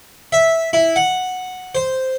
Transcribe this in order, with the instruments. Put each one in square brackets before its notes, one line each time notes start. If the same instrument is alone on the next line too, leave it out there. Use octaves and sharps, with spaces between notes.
[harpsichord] E5
E4
F#5
C5